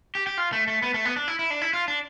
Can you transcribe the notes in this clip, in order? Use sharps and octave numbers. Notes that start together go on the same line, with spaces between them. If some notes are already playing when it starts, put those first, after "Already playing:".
G4
G4
F4
A3
A3
B3
A3
B3
D4
E4
E4
D4
E4
F4
D4